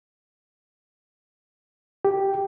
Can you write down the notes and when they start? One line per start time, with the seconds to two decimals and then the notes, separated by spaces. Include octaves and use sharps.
2.05 G4